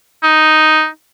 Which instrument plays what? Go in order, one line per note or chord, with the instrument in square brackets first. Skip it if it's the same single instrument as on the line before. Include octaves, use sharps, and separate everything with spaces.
[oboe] D#4